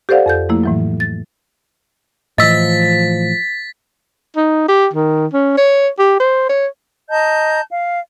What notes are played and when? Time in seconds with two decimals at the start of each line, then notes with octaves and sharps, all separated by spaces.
0.09 G4 A4 C5 D5 F5 F#5
0.26 F2 A4 G6
0.49 F3 A3 A#3 E4
0.64 A2 E3 F#3
1.00 A6
2.38 A2 E3 F3 D#5 E6 A6 B6
4.36 D#4
4.68 G4
4.94 D#3
5.33 C#4
5.57 C#5
5.99 G4
6.20 C5
6.49 C#5
7.11 D#5 A5 A#5 G6
7.71 F5